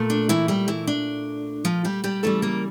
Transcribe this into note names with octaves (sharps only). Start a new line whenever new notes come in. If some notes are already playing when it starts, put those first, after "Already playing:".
Already playing: A#2 A3
D4
E3 E4
G3 G4
E3 E4
D4
F3 F4
G3 G4
G3 G4
C#3 E3 G3 A3 A4
A#3 A#4